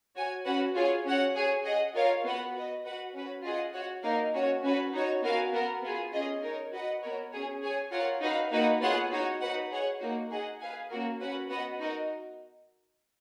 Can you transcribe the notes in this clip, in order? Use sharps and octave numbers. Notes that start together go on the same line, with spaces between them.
F#4 C#5 G#5
C#4 F#4 B4 F#5
F4 G#4 C#5
C#4 F#4 C#5 F#5
G#4 C#5 G#5
G#4 D#5 F#5
F4 A#4 C#5 F5
B3 F#4 B4 F#5
F#4 B4 D#5
F#4 B4 F#5
C#4 F#4 B4
F4 G#4 D#5 F#5
F#4 C#5 F#5
A#3 D#4 A#4 F5
C#4 F#4 C#5
C#4 F#4 B4
D#4 F#4 C#5
B3 F#4 A#4 F5 G#5
B3 F#4 A#4
B3 F4 G#4
C#4 F4 G#4 D#5
D#4 A#4 C#5
F#4 B4 D#5 F#5
B3 F#4 A#4 C#5
C#4 G#4 C#5
G#4 C#5 G#5
F4 A#4 C#5 F#5
D#4 F#4 B4 F5
A#3 D#4 F#4 B4 F#5
B3 F4 G#4 C#5 F#5
D#4 F#4 C#5
D#4 F#4 B4 F#5
G#4 C#5 F#5
A#3 D#4 F#4
D#4 G#4 D#5 F#5
G#4 B4 F5 G#5
A#3 C#4 F#4 A#4
C#4 F#4 B4 F#5
B3 F#4 B4 D#5 F#5
D#4 F#4 A#4 D#5